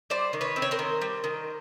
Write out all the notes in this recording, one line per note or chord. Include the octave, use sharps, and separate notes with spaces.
G3 C5 D5
D#3
B4 C#5
C4
C#5
A#4 C5
D#3
G3
D#3